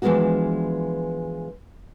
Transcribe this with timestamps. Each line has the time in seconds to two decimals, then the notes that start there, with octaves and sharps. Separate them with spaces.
0.02 E3 F3 G#3 B3 D4 F#4